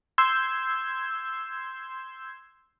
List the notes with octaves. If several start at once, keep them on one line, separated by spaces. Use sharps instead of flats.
C6 E6 G6 G#6